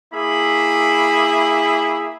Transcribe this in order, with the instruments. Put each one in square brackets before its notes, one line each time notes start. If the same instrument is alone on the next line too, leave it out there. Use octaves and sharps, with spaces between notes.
[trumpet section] A#3 E4 G#4 E5 B5